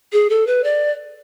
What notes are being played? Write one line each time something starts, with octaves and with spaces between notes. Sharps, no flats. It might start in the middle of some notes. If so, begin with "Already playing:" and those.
G#4
A4
B4
D5